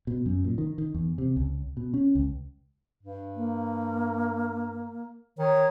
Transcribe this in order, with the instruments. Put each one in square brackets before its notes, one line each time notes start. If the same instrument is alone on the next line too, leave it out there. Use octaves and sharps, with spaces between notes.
[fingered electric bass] B2
F#2
A#2
D#3
D#3
E2
C3
C#2
B2
C#4
C#2
[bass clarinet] G2
[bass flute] A#3
[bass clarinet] D#3 [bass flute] C#5